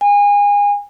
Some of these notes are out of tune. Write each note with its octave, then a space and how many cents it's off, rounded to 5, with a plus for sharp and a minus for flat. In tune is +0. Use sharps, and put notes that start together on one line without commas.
G#5 -30